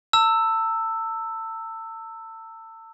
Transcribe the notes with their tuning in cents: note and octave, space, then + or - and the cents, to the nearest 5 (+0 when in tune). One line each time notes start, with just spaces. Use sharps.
A5 +40 E6 +0